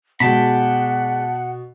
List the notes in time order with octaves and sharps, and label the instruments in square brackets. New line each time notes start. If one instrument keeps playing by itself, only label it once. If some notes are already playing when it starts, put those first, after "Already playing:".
[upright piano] B2 [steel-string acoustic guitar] G#3 D5 [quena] F#5 [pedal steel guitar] G5 A5 B5